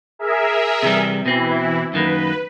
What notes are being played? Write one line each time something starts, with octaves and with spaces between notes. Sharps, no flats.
G#4 A#4 E5
C3 E3 G3
B2 E3 C4 E4
F#2 D#3 A#3 B4